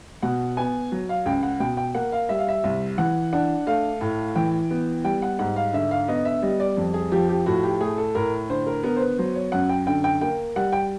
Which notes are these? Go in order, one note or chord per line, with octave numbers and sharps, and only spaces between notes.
B2 F#5
B3 G#5
F#3
F5
C#2 G5
F#5
B2 G5
G5
A#3 F#5
F5
G3 E5
F5
E5
C2
E3 F#5
D4 F#5
A3 F5
A2
E3 G5
B3
G3 G5
F#5
G#2 F#5
F5
D3 E5
F5
B3 D#5
E5
G3 D#5
D5
F2
G#4
F3 G4
G4
A2 F#4
G4
A3 G#4
A4
A2 A#4
D3 C5
A#4
B3 A#4
C5
B4
F#3 C5
C#5
F#2 F#5
G5
D3 G5
G5
A#3 G5
G3 F#5
G5